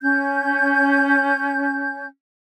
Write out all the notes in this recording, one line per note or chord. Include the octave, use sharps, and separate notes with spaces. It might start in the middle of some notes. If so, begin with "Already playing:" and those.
C#4 G6